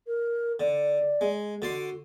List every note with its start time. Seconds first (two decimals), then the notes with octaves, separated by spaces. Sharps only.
0.07 A#4
0.60 D3 D5
1.21 G#3
1.62 D3 F#4 D5 C6